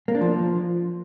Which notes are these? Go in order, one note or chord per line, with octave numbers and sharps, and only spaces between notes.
A#3
D4
F3